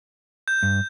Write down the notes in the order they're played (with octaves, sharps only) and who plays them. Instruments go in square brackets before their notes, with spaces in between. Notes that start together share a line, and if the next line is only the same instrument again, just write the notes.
[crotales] G6
[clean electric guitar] G2